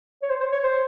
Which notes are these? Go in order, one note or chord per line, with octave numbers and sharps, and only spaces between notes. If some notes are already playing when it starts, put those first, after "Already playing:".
C#5
C5
C5
C#5
C5